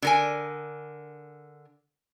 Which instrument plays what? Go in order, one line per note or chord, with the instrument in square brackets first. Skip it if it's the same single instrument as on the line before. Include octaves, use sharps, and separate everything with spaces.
[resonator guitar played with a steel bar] D3 A#4 G#5